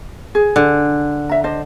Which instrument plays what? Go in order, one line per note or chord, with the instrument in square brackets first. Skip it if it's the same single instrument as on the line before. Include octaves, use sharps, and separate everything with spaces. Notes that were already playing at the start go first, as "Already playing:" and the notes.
[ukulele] G#4
[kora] D3
[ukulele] E5 A#5
D4 C5 D#5